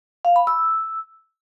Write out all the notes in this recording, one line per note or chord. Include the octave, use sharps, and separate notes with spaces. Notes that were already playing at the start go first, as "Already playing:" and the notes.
F5
B5
E6